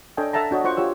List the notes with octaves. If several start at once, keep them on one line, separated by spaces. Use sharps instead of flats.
D4 A4 C#5 D#5 G5 G#5
A4 E5 F#5 A5 A#5
D4 F#4 C#5 D#5
F4 C5 F#5 C#6
F4 G4 C#5 E6